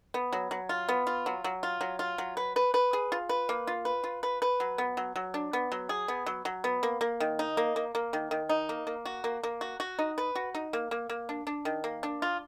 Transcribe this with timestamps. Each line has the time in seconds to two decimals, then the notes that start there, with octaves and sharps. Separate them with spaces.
0.14 B3
0.33 F#3
0.51 F#3
0.69 F4
0.89 B3
1.07 F4
1.26 F#3
1.44 F#3
1.63 F4
1.81 F#3
1.99 F4
2.18 F#3
2.37 B4
2.56 B4
2.74 B4
2.93 G#4
3.12 F4
3.29 B4
3.49 A#3
3.67 F4
3.85 B4
4.04 F4
4.23 B4
4.42 B4
4.60 F#3
4.78 B3
4.97 F#3
5.16 F#3
5.34 D4
5.53 B3
5.72 F#3
5.89 G#4
6.08 B3
6.26 F#3
6.45 F#3
6.64 B3
6.83 A#3
7.01 A#3
7.20 D#3
7.39 D#4
7.57 A#3
7.76 A#3
7.95 A#3
8.13 D#3
8.31 D#3
8.49 D#4
8.69 A#3
8.87 A#3
9.05 F#4
9.24 A#3
9.43 A#3
9.61 F#4
9.80 F#4
9.99 D#4
10.18 B4
10.35 F#4
10.55 D#4
10.73 A#3
10.91 A#3
11.10 A#3
11.29 D4
11.47 D4
11.65 D#3
11.84 A#3
12.03 D4
12.22 F4